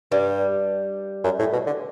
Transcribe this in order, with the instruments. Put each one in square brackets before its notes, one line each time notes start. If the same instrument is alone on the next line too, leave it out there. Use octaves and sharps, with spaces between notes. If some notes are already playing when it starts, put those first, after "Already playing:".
[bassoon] G2 [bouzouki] G3
[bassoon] F#2
A2
B2
D3